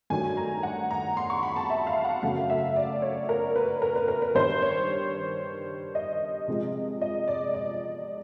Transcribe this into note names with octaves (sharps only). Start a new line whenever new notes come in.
G2 D#3 F#3 A3 G#5
A#5
F#5
A#5
C6
C#6
B5
A5
E5
F5
F#5
F#2 C#3 F#3 A3 F5
E5
D5
C#5
A#4
B4
A#4
B4
A#4
B4
G2 D#3 G3 C5
C#5
D#5
C3 F3 G#3
D#5
D5
D5